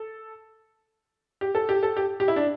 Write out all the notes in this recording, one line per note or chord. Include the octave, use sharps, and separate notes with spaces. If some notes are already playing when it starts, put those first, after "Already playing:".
Already playing: A4
G4
A4
G4
A4
G4
G4
E4
D4